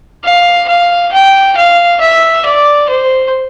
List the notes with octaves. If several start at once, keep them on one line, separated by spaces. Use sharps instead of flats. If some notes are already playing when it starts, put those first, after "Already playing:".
F5
F5
G5
F5
E5
D5
C5